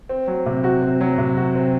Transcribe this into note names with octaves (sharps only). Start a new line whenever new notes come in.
C4
F#3
C3
F#4
C4
F#3
C3
F#4
C4